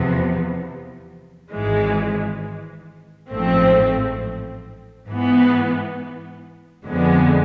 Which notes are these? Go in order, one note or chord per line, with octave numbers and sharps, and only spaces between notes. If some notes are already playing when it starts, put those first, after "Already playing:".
Already playing: E2 C3 F3 B3
G#1 G#2 E3 G#3
A1 G#2 F3 A3 C4
G#2 E3 B3
F2 D3 F3 G#3 B3